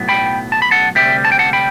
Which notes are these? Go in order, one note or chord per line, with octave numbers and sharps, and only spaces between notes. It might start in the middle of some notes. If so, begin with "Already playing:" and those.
Already playing: B1 A2 F#3 B3
G5 B5
A5
B5
F#5 A5
D2 C3 G3 E5 G5
A5
G5
F#5 A5
G5 B5